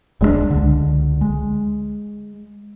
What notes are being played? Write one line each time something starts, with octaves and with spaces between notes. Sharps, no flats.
D#1 G#3 A3 D4
C#2 D3
G#3